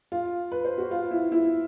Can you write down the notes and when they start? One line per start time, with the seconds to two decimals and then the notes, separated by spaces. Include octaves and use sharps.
0.12 F4
0.52 B4
0.65 C5
0.78 F#4
0.91 F4
1.11 E4
1.32 E4